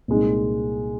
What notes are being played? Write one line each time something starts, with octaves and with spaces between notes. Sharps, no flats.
C2 A#2 G#3 D#4